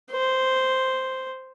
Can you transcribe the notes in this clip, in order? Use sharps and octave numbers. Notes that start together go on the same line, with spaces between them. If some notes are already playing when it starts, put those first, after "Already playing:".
C5